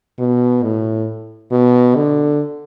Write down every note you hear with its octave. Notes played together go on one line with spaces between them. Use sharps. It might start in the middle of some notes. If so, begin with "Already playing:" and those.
B2
A2
B2
D3